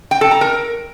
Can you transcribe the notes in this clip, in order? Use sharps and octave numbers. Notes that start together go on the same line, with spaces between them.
G5
A4
A#5
A#4